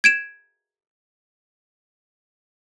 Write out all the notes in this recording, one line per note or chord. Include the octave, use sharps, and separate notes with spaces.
G#6 D7 E7